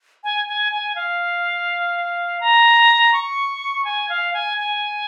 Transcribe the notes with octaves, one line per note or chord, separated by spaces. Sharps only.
G#5
G#5
G#5
F5
A#5
C#6
G#5
F5
G#5
G#5